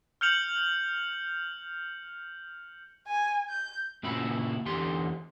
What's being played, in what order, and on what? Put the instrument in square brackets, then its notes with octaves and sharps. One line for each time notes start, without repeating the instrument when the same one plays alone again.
[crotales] F6 G6 C#7 F7 F#7
[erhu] G#5
G6
[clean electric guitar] A#2 C#3 E4 F#4 B5
E2 D3 G4 C6